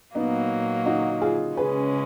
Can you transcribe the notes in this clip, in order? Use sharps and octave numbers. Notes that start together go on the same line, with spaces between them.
A#2 F#3 A#3 B3 D#4
D#4 F#4
F4 G#4
C#3 G#3 C#4 G#4 B4